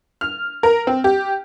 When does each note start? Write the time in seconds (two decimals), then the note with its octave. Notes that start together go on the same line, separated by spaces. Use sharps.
0.21 F6
0.63 A#4
0.87 C4
1.04 G4